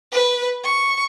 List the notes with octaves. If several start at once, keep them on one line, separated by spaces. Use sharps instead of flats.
B4
C#6